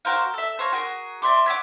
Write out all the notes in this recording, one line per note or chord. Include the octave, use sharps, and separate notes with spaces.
F#4 A#4 C5 F5
A4 E5
C5 C#5 F5 A#5
F#4 G#4 A#4
D5 E5 C6 D6
C#5 E5 F#5 D6